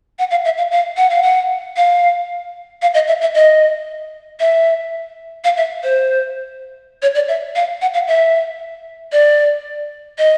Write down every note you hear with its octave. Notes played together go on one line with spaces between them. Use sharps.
F#5
F5
E5
F5
F5
F#5
F5
F#5
F5
F5
D#5
E5
E5
D#5
E5
F5
E5
C5
C#5
D5
E5
F5
F#5
F5
E5
D5
D#5